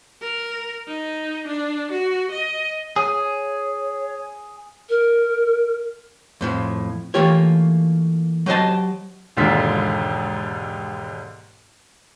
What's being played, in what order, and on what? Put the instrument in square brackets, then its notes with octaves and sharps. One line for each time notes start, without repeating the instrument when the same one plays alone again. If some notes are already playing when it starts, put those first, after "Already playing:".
[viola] A#4
D#4
D4
F#4
D#5
[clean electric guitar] G#4 [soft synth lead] C#5
[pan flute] A#4
[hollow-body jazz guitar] F2 A2 F3
E3 A3 A#3 F4 G4 C#5
F#3 G4 C5 D#5 A5
[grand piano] E1 D#2 G#2 D3 F4 B6